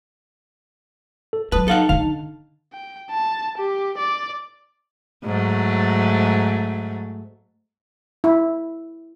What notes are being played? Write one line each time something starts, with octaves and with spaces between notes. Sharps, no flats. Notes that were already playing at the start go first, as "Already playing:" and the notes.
A4
F#3 G3 B4 A5 D#6
D#4 A4 F5 F#5 A5
D3 D4 F5
G5
A5
G4
D5
G#2 F#3 A3
E4